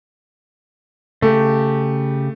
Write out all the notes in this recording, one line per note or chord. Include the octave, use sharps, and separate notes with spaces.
C#3 A3 G4